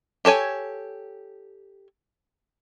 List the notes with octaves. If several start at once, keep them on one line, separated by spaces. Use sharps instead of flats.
G4 A4 C#5 G#5